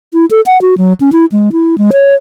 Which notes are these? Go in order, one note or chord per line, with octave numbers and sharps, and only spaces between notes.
E4
A4
F#5
F#4
F#3
C#4
E4
G#3
E4
G#3
C#5